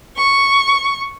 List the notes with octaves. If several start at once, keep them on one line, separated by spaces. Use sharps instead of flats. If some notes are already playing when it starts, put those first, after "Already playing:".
C#6